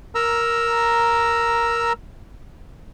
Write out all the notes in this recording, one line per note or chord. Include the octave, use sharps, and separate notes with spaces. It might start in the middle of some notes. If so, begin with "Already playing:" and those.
A#4 A#5 E6